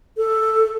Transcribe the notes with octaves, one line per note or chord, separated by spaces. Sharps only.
A4